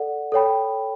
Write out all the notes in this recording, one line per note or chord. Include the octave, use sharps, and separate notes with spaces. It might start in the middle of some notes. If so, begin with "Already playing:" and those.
Already playing: A4 D5 F#5
A4 C#5 G5 B5